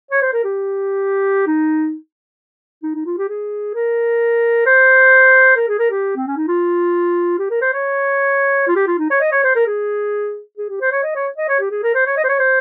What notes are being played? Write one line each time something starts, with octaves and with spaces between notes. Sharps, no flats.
C#5
C5
A#4
G4
D#4
D#4
D#4
F4
G4
G#4
A#4
C5
A#4
G#4
A#4
G4
C4
C#4
D#4
F4
G4
A#4
C5
C#5
F4
G4
F4
D#4
C#5
D#5
C#5
C5
A#4
G#4
G#4
G4
C5
C#5
D#5
C#5
D#5
C#5
G4
G#4
A#4
C5
C#5
D#5
C5
C#5
C5